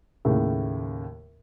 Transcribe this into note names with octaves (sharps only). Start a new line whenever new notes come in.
D#2 A2 C#3